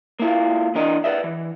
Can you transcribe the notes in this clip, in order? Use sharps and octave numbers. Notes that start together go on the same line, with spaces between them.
A#3 E4 F4
E3 D4 A#4 D#5
B4 C5 D5 E5
E3